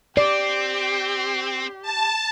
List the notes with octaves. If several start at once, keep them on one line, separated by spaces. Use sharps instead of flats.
C4 G4 D5
A5